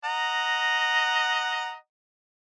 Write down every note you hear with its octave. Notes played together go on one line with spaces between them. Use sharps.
D#5 F#5 A#5